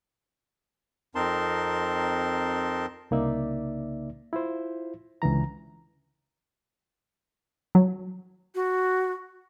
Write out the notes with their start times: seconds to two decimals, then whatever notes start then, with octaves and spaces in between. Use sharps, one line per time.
1.15 F2 C4 D#4 A#4 A5 C6
3.11 C2 C#3 A#3 D#4 D5 E5
4.33 E4 F4 C5
5.22 C#2 D3 E3 A#5
7.75 F#3
8.55 F#4